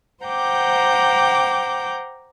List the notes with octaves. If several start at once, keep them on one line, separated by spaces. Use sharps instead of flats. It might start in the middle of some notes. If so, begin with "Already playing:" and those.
C5 F#5 G5 A#5 D6 G6